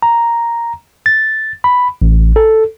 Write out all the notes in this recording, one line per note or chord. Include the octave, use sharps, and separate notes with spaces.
A#5
A6
B5
A1
A4